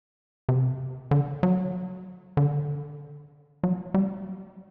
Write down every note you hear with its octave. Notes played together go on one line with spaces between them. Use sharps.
C3
D3
F#3
D3
F#3
G3